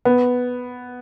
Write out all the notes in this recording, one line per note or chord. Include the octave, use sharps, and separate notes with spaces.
B3